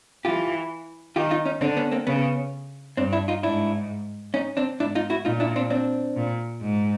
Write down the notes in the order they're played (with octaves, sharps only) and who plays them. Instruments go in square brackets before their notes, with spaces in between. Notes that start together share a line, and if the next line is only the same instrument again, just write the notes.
[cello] E3 [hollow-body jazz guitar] F4 G4
[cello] D#3 [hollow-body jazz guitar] F4 G4
[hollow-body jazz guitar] D#4 F4
C#4 D#4
[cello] D3 [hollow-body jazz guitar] C4 D4
[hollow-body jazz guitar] B3 C#4
A#3 C4
[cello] C#3 [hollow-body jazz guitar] B3 C#4
[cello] G2 [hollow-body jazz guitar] C4 D4
[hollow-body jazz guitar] D4 E4
D#4 F4
[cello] G#2 [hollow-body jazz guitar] D4 E4
[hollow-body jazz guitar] C#4 D#4
C4 D4
[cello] G#2 [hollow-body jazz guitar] D4 E4
[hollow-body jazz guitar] D#4 F4
E4 F#4
[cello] A#2 [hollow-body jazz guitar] D#4 F4
[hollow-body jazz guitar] D4 E4
C4 D4
C4 D4
[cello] A#2
G#2